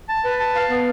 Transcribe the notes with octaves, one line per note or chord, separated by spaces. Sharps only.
A5
B4
A5
F5
B3